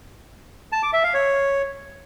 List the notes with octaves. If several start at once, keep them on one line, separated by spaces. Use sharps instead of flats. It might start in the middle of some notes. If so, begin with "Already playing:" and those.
A5
D6
E5
F5
C#5